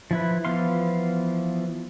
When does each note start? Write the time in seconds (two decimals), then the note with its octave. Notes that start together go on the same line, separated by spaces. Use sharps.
0.11 F3 E4 B4
0.45 E3 F3 B3 F5 C6